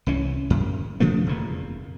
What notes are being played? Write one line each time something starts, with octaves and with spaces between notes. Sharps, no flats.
C2 E3 C#4
F#2
C#3 F3 A3 A#3
F1 E2 A#2